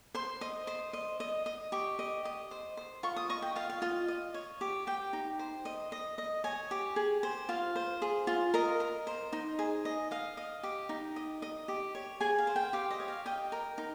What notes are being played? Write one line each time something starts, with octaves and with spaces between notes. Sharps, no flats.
C5 C6
D#5
C5
D#5
D#5
D#5
G4 C#6
D#5
D#5
C5
C5
F4 C#6
D#6
D#5 C#6
G5
F4 F5
F5
F4 D#5
D#5
C#5
G4
G4 G5
D#4
C5
D#5
D#5
D#5
C#5 G#5
G4
G#4
C5
F4 F5
C5
G#4
F4
A#4 D#5
A#4
C5
D#4
G#4
D#5
D#5 F5
D#5
G4
D#4
D#5
D#5
G4
C#5
G#4 G#5
F5
C5
G5
G4 F5
D#5
C#5
F5
D#5 G5
A#4
D#4